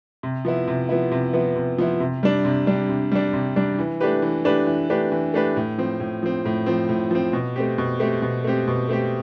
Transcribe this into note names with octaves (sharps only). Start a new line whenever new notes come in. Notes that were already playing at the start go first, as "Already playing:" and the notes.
C3
F3 B3 E4
C3
F3 B3 E4
C3
F3 B3 E4
C3
F3 B3 E4
C3
G3 D4
C3
G3 D4
C3
G3 D4
C3
G3 D4
E3
A3 D4 G4 B4
E3
A3 D4 G4 B4
E3
A3 D4 G4 B4
E3
A3 D4 G4 B4
A2
F3 C4
A2
F3 C4
A2
F3 C4
A2
F3 C4
B2
A3 C4 G4
B2
A3 C4 G4
B2
A3 C4 G4
B2
A3 C4 G4